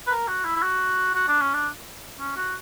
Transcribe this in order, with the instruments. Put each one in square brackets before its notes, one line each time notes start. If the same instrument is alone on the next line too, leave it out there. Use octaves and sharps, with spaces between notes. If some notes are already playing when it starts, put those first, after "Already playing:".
[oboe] B4
A#4
F#4
E4
E4
F#4
F#4
D4
C#4
D4
C#4
F#4